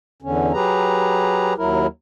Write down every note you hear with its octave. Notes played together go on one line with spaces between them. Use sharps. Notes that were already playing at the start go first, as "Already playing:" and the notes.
E2 D3 C#4
F#3 G4 G#4 B4 A#5
D#2 F#3 E4 A#4